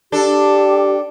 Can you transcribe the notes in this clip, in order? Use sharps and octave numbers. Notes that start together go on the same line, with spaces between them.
D4 G4 A4